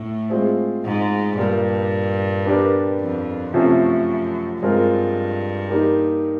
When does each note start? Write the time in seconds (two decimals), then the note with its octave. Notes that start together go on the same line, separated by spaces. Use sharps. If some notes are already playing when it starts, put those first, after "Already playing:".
Already playing: A2
0.29 G#3 C4 F4 G#4 C5
0.84 G#2
1.37 G2 A#2 G3 A#3
2.45 B3 D4 G4 A#4 D5
3.00 F2
3.54 F#2 C3 F3 A3 C#4
4.61 G2 G#3 C4 F4 A#4
5.69 A#3 D#4 G4 A#4